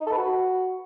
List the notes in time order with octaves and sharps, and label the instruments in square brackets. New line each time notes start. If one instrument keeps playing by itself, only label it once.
[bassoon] D#4
A4
B4
F#4